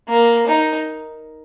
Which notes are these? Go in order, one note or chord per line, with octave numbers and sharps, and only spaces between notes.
A#3
D#4